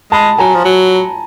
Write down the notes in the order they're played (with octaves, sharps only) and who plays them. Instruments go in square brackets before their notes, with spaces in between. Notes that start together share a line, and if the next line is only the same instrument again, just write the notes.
[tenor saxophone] G#3 [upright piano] A5 B5
[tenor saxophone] F#3 [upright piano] G#5 A#5
[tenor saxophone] F3
F#3